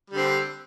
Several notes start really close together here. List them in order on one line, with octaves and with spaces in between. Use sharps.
G3 D3 C4